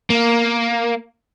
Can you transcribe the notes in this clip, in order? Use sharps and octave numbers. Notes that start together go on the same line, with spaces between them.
A#3